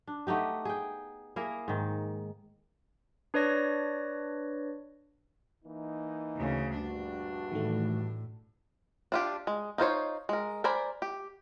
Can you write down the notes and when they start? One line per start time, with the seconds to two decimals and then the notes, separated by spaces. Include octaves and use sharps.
0.07 D4
0.27 A3 B3 D#4 G4
0.65 G#4 G5
1.36 A#3 E4 G#4 A#4
1.68 G#2 D#3
3.34 D4 B4 C#5 D5 A#6
5.65 E3 A#3 D#4
6.36 D2 C#3
6.75 A#1 G2 D4 F#4
7.52 A2 D#3 E3 A3
9.12 D4 F4 G4
9.47 G#3
9.78 D#4 F4 C5 C#5
10.29 G#3 A#4
10.64 A#4 C5 D5 G#5 B5
11.02 G4